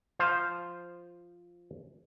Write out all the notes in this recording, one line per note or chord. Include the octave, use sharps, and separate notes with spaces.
F3 F4 C5 F5